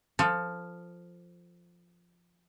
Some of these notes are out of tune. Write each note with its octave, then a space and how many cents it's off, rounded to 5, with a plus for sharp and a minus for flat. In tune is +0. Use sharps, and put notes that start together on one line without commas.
F3 +0 A4 +20